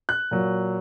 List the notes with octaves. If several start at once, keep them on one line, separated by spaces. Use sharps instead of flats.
F#6
A#2 F#3